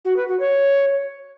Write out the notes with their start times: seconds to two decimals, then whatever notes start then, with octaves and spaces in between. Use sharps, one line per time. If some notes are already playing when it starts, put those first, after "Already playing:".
0.04 F#4
0.16 B4
0.28 F#4
0.39 C#5